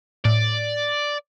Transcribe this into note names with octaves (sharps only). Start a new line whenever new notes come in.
A2 D5